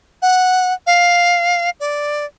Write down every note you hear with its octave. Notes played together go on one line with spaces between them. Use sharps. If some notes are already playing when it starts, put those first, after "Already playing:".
F#5
F5
D5